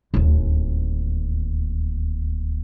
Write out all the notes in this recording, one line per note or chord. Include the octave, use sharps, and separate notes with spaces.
D1 D#2